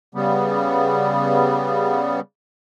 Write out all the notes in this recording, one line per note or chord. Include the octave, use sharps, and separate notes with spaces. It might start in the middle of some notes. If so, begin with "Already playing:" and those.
C#3 G3 B3